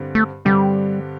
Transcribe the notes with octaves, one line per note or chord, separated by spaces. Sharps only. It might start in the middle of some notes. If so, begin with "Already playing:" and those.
Already playing: G2 D3 C4 G4
A3
G2 D3 G3 C4 G4